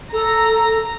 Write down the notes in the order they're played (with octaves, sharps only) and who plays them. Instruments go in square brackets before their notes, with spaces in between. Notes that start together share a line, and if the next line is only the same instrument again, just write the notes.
[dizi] A4 [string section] A#5